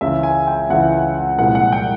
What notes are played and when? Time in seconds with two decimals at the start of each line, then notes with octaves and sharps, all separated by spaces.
0.01 C#2 C#3 E3 E5
0.23 G#5
0.47 G5
0.70 C#2 C#3 E3 F#5
1.39 C2 A#2 F3 G#3 F#5
1.55 F#5
1.72 G5